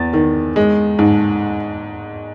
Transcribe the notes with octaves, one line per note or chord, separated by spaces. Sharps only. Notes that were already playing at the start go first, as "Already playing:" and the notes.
Already playing: E2 A6
D#3
G#3
G#2